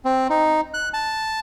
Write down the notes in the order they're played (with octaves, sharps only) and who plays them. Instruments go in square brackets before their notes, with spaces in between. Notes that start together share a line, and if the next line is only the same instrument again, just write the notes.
[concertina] C4
D#4
F#6
A5